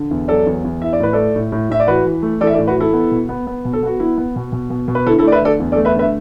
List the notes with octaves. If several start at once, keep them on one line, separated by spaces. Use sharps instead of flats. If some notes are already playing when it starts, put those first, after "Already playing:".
Already playing: D3
E2
F#3 A4 D5
E2
E2
E3 E5
D5
A2 B4
A3 A4 D5
A2
A2
A2 E5
D5
E3 F#4 B4
E3
A3
E3 A4 D5
E5
A4 D5
A2
F#4 B4
E3 E4 A4
B3
B2
B3
B3
B2
A4
B3 F#4
B3 E4
B3
B2
B2
B2
B2
B4
D3 E4 A4
E4 A4
A3 D5
B4 E5
D3 A4 D5
E2
A4 D5
A3
B4 E5
D3 B4 E5